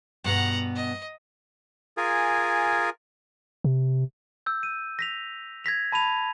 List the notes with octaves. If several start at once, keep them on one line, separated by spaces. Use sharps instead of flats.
G2 B2 B3 F#5 A#5
D#5
F4 G#4 A#4 G#5
C3
E6 G6
D#7
A#6 B6 F7
G#6 A#6 B6 F7
A5 B5 D#7 F7